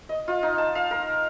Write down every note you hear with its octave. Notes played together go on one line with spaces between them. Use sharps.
D#5
F4
D#4
A5
F5
A#4